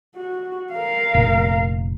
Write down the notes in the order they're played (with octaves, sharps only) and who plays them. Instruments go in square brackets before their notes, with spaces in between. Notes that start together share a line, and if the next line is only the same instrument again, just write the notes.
[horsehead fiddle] F#4
A#4 F5
[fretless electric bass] F1 A#2